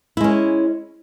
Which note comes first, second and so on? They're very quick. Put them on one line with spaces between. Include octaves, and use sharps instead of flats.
E4 G#3 C#4